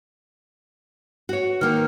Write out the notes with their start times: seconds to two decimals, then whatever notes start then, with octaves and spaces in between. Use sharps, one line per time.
1.29 F#4 C#5
1.61 D#3 A#3 F6